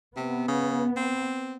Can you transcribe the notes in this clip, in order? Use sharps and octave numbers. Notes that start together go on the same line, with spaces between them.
C3 B3
C#3
C4